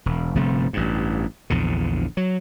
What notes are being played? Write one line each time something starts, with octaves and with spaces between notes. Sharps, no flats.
E1
G1 C3 F3 A3
A1 G2
A#1 E2 D3
F#3